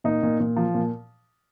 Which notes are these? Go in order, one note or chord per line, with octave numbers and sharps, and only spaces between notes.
A#2 D#4
A#2
A#2
F3
A#2